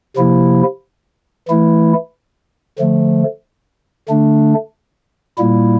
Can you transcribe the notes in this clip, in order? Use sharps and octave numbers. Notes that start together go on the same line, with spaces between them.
C3 F3 A#3 E4
E3 A3 E4
D3 F3 A3
D3 A3 D4
A#2 G3 A#3 E4